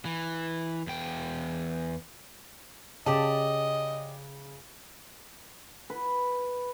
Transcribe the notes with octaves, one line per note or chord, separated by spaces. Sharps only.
E3
E2 G5
C#3 G4 D5 D#5 A5
B4